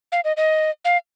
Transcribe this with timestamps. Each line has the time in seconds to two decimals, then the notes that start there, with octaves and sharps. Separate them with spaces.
0.12 F5
0.24 D#5
0.37 D#5
0.85 F5